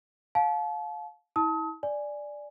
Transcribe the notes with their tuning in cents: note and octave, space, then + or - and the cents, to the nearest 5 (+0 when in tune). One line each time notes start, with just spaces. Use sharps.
F5 +25 A5 -35
E4 -35 A5 +0 D#6 +35
D5 +0 G#5 +0